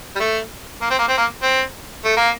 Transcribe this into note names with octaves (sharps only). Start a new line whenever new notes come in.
G3
A3
A#3
C4
A#3
C4
A#3
C4
A3
A#3